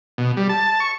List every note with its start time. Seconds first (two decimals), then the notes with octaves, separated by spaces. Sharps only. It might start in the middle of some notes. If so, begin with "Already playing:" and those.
0.18 B2
0.37 G3
0.49 A5
0.80 C#6